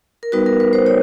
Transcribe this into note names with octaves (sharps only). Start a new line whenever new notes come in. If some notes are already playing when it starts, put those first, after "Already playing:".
A#4
G3 B3 D#4 F#4 B4
A#4
B4
C5
C#5